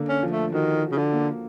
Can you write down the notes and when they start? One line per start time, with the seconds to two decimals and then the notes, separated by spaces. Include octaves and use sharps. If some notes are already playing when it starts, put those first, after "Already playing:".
Already playing: D3 A#3
0.08 C#4
0.23 F3
0.30 A3
0.52 D#3 F#4
0.83 F#4
0.91 C#3
0.97 D3
1.13 A#3